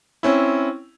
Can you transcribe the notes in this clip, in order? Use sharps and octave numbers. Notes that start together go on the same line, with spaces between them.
C4 C#4 E4